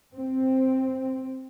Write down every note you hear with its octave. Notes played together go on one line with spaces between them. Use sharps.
C4